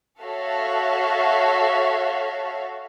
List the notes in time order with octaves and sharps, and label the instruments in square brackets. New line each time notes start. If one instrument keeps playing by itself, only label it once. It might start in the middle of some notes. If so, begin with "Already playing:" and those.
[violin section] F#4 A4 C#5 E5 F5